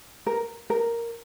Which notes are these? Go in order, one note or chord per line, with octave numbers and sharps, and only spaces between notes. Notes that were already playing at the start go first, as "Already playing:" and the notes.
A#4
A#4